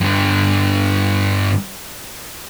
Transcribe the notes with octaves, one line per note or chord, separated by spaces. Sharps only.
G2 D3